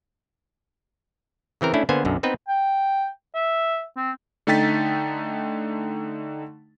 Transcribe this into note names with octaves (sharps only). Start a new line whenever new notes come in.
C#3 E3 C4 A#4
A3 C#4 D4 E4
D3 A#3 B3 C5 G#5
B1 F#2 D3
B3 C4 D#4 B4
G5
E5
C4
D3 A3 D#4 G5 A6 B6